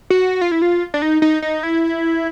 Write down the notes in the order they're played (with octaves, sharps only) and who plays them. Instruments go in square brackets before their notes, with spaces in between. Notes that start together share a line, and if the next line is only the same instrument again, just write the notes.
[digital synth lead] F#4
F4
E4
F4
D4
D#4
D#4
D#4
E4